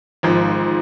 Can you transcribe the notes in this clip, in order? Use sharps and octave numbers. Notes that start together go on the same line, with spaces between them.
G#1 G#2 F3